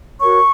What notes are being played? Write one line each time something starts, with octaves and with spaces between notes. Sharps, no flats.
F#4 A#4 C#5 C#6